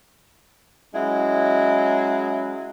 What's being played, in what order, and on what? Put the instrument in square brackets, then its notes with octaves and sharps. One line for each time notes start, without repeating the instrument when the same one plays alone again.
[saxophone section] F#3 G#3 C#4 E4